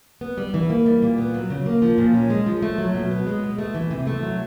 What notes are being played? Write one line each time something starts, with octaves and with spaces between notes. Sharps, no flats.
B3
G3
E3
A#3
G3
A#2
B3
F#3
C#3
A#3
F3
A#2
C#4
G#3
F3
A3
F#3
B2
B3
G#3
B2
A3
E3
C3
A3
F#3